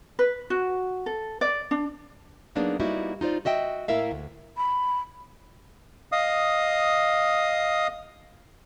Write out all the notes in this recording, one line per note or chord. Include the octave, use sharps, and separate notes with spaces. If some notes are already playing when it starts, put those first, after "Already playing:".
B4
F#4
A4
D5
D4
F#3 A#3 B3 D4 D#4 G#4
G3 A#3 B3 D#4 E4 F#4
D#4 F4 C5 D5
F#4 D#5 E5 G5
A2 A#3 E4 A#4 E5 F5
D2
B5
D#5 F5 D#6